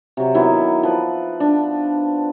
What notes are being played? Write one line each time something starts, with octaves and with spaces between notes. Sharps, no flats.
C3 F#3
D#3 F#3 B3 E4
F3 B4
D4